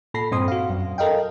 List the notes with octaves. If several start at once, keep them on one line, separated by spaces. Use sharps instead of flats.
A#2 A4 B5 A#6 C7
G2 A#2 C4 C6 D#6
F#4 F5
F#2
A4 A#4 D#5 F5 G5